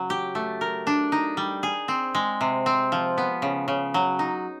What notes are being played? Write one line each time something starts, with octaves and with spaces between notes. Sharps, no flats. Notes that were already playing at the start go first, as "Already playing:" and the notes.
Already playing: C#3 F#3
G4
A3
A#4
D4
D#4
G3
G#4
C4
G#3
C3
C4
F3
B3
C#3
C#3
F#3
D#4